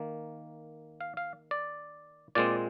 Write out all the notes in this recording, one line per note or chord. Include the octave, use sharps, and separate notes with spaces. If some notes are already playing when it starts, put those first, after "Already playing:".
Already playing: D#3 A#3
F5
F5
D5
A#2 G#3 C4 D5